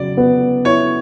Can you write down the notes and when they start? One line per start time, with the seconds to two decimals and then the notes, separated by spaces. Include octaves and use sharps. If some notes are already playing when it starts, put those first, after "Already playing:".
Already playing: C#3 F#3 D5
0.17 B3
0.65 E4 C#5